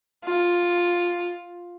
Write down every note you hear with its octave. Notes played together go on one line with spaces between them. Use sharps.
F4